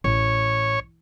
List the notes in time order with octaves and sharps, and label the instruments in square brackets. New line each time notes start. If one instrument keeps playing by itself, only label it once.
[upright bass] A1 [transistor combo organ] C#5